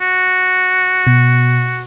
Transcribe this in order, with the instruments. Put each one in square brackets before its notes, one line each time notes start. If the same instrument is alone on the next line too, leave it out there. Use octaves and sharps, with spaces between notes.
[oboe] F#4
[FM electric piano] B2